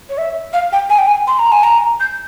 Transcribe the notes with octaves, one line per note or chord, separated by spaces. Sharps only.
C#5
E5
F5
G5
G#5
G5
G#5
C6
A#5
G#5
A#5
G6